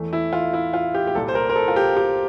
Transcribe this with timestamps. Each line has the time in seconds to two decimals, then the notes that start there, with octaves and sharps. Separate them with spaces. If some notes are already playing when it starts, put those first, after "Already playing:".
Already playing: E2 E3 A3
0.13 E4
0.33 F4
0.53 E4
0.74 F4
0.94 G4
1.07 G4
1.15 C2 A#2 G3 A4
1.28 C5
1.35 A#4
1.50 A#4
1.56 A4
1.68 F4
1.76 G4
1.97 G4